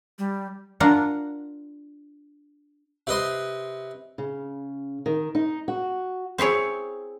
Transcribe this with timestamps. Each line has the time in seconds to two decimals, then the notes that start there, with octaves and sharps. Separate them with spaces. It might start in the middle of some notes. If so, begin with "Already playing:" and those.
0.19 G3
0.80 D4 F4 A#4 F#5
3.07 C3 B4 D#5 C6
4.18 C#3
5.06 D#3
5.35 D#4
5.68 F#4
6.38 C4 E4 G#4 C#5